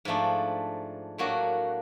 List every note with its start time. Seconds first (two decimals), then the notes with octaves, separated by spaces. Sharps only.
0.05 G#2 F3 A3 D4
1.18 A2 F#3 A#3 D4 F#4